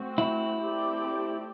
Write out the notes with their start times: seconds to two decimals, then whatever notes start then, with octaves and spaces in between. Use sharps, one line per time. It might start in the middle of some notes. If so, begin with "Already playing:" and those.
Already playing: A3 C4 F#4
0.18 E4
0.60 A3 C4 G4 D5